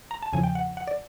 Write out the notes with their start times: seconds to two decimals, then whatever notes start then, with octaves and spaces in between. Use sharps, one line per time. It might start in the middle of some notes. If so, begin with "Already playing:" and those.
0.11 A#5
0.22 A5
0.33 E2 C#3 F3 G#5
0.43 G5
0.55 F#5
0.77 F#5
0.88 D5